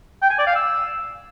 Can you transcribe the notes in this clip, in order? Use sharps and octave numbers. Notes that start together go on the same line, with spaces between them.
G5
G#5
D5
F5
E6